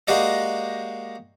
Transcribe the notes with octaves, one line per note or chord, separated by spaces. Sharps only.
G#3 A#3 F#4 G4 D5 D#5